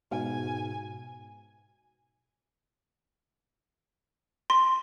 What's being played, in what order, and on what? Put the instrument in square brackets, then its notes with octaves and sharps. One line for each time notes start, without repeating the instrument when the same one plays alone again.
[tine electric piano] G#2 B2 [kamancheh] G#5
[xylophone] C6